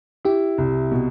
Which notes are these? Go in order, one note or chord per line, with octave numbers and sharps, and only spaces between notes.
E4 G4
C2
B2